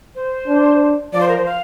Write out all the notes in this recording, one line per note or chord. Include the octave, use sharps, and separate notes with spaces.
C5
D4
F3 D5
C5
A#4
C5
F5